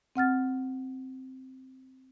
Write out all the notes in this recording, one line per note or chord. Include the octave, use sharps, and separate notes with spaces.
C4 F#5 F6 A6